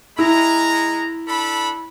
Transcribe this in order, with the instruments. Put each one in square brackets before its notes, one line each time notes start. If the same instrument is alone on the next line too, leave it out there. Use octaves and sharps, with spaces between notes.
[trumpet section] G#3 A#5 [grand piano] E4
[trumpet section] D4 A4 B5